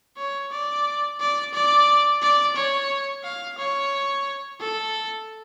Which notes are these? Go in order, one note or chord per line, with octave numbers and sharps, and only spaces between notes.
C#5
D5
D5
D5
D5
C#5
F5
C#5
A4